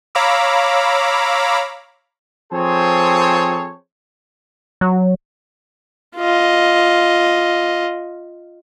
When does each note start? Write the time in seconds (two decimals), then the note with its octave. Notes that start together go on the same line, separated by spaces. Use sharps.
0.15 C#5 F5 A#5 B5 D6 E6
2.53 F3 C4 G#4 A4 C5 C#5
4.81 F#3
6.17 F4 D#5